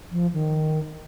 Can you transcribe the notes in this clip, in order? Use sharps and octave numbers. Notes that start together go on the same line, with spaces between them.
F3
D#3